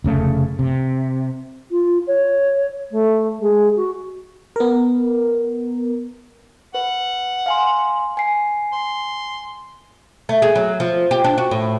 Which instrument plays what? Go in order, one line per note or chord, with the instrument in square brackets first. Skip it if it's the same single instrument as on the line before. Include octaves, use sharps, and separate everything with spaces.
[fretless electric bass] F1 C#3 A3
C3
[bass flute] F4
C#5
A3
G#3
F#4
[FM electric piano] B3 A#4
[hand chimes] B4 [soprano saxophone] F#5
[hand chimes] F5 G#5 C6
G#5 C7
[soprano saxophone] C6
[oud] A3
G#4
F#3
F3
G4
D4
F#4
A2